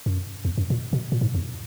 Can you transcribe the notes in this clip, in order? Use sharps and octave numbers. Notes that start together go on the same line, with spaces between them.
F#2
E2
F#2
A#2
B2
A#2
G#2
E2